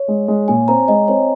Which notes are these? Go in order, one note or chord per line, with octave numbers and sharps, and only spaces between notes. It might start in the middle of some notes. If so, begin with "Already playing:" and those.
Already playing: C#5
G#3
G#3
A#2 G#5
C4 A#5
G#3 D#5
C4 C#5